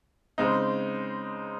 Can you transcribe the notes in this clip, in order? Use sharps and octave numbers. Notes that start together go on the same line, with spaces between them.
C#3 G#3 C4 D#4